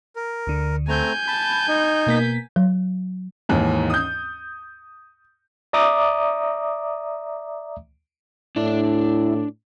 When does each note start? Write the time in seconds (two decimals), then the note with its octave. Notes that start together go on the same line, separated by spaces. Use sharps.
0.16 A#4
0.47 D2 D3
0.88 A3 C4 G#5 A#5 G6
1.28 A5 B5
1.68 D#4
2.07 B2 A#3 B6
2.56 F#3
3.49 D#2 G#2 E3
3.90 D#6 G6
5.73 D5 E5 A#5 D6 D#6
8.56 A2 D4 E4 D5